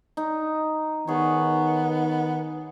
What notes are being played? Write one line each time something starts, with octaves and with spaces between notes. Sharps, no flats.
D#4
D#3 B3 G#4 C#5